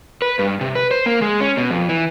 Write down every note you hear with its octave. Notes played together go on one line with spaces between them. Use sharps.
B4
G2
C3
B4
C5
A#3
G#3
C#4
B2
F2
E3